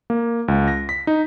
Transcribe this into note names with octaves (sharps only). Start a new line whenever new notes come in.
A#3
C#2
A#6
B6
D#4